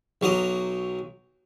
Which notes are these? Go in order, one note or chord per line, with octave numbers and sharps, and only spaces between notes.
B1 F#3 A#5 D#6